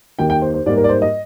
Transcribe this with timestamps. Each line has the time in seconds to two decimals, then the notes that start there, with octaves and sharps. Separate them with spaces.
0.19 D#2 D#3 A#3 G5
0.30 G5
0.42 C5
0.54 C5
0.66 G#2 G3 A#3 D5
0.77 A#4
0.84 D5
0.89 C5
1.02 D#5